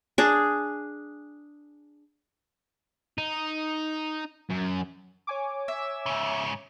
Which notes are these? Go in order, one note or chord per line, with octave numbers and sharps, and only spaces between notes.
D4 G#4
D#4
F#2
C#5 G#5 D6
E5
G#2 C#3